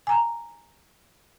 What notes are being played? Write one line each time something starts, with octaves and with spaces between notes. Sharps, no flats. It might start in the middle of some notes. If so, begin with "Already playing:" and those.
G#5 A#5